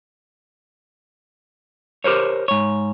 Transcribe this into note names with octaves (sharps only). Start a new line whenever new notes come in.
G4 A#4 C5 C#5
G#2 C#5